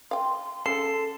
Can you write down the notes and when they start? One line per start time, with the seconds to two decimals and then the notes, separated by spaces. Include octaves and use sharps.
0.11 F5 G5 C6
0.66 C#3 A4 C7